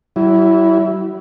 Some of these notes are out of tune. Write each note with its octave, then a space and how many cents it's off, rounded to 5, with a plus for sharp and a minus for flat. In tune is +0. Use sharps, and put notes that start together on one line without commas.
F#3 +40 E4 +0